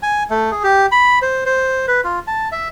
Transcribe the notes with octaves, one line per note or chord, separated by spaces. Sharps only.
G#5
A3
G#4
G4
B5
C5
C5
B4
F4
A5
E5